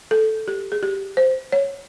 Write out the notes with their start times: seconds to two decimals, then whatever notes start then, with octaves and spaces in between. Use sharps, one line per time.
0.11 A4
0.48 G4
0.72 G#4
0.83 G4
1.17 C5
1.52 C#5